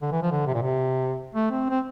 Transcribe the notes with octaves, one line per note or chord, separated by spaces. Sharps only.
D3
E3
F3
D3
C3
A#2
C3
A3
C4
C4